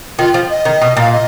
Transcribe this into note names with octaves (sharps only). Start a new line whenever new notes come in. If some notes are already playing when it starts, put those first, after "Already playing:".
D#3 F4
F3
D#5
D#3
B2
A#2 F5
D#5